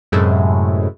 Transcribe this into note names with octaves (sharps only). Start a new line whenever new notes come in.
F#2 A2 C3 G#3 A3 E4